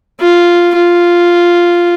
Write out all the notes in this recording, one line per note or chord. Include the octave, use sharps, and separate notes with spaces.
F4
F4